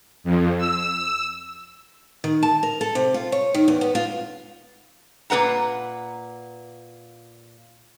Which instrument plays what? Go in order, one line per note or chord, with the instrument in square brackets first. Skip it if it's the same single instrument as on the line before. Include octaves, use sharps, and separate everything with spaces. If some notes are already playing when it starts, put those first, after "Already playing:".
[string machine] F2
E6
[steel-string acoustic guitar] D#3
A5
A#4
A4
C3
F4
C#5
D#3
E2
B3
F4
[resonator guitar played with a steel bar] A#2 C4 B4 F#5 A#5